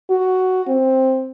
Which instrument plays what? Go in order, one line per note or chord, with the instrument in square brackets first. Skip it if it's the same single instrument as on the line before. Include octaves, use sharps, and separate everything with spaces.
[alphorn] F#4
C4